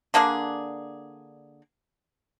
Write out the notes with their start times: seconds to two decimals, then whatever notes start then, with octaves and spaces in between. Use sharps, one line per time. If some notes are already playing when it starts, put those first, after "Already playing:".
0.14 D3 A#3 D4 G#4